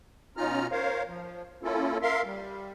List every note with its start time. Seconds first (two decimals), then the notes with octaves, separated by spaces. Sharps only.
0.37 B2 C#4 D#4 F4 A#5 F6
0.71 A#4 C5 C#5 F5
1.08 F3
1.63 A#3 C#4 E4 F4 A4
2.02 A#4 E5 F5 C6
2.25 G3